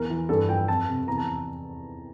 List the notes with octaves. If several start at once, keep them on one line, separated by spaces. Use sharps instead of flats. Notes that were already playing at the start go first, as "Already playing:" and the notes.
Already playing: E2 A#4
E3
G2 A4
F3 G5
F2 A5
C3
E2 A#5
A5